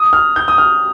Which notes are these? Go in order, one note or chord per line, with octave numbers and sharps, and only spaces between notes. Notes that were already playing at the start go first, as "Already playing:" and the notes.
Already playing: D#6
F6
G6
D#6
F6